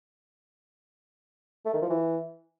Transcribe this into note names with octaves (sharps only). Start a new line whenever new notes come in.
A3
D#3
F3
E3